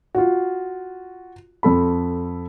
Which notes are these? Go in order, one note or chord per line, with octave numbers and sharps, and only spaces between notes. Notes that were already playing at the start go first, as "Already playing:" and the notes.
F4 F#4
F2 A4 B5